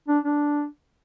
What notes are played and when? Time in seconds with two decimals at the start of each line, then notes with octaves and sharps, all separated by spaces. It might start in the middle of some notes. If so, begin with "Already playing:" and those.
0.08 D4
0.24 D4